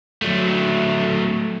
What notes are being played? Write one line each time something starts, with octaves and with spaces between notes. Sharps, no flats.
F#3 A3